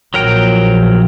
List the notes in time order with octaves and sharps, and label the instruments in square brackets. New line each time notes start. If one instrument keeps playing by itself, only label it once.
[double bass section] A#1 F3 [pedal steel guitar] F#3 A#4 G5